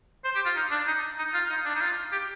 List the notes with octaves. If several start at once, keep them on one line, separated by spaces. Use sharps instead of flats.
C5
G4
F4
D#4
D4
D#4
D#4
F4
D#4
D4
D#4
F4
G4